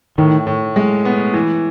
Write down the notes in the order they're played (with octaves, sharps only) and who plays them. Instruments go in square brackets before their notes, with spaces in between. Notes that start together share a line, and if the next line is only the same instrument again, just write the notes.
[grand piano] A2 [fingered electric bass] D#3
[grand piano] A2
G#3
B3
E3